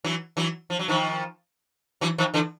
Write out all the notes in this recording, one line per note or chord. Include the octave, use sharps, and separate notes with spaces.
E3 F#3
E3 F#3
F3
F#3
D#3 F3
E3 F#3
D#3 F3
D3 E3